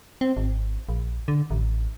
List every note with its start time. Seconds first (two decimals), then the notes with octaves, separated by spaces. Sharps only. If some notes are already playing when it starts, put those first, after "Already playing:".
0.21 C4
0.37 G#1
0.89 A#1
1.28 D3
1.51 A1